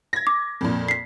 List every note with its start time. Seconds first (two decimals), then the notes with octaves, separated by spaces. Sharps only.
0.13 G#6 A#6
0.27 D6
0.61 F2 A#2
0.88 B6 C7